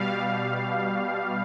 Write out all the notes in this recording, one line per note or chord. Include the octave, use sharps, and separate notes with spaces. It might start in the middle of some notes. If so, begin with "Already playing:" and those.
Already playing: B2 G3 F5